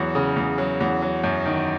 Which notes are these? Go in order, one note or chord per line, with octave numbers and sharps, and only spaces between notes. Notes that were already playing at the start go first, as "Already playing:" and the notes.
Already playing: E2 F#3 F#4
C#3
E2
F#3
E2
F#3
F#2
D#3